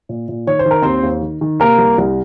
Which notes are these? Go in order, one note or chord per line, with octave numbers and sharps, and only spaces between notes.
A#2
A#2
D#3 C#5
C5
D#3
A#4
D#2 C4 C5
D#2
D#3
D#3
C3 A#3 A#4
C2
C2